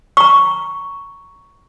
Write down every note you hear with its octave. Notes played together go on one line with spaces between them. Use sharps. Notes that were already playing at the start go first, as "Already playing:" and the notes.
A#5 C#6